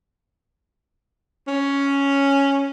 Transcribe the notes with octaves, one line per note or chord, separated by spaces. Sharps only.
C#4